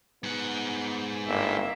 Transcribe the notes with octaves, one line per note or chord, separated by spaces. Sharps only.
G#2 B3 F#5
G1 A#3 E5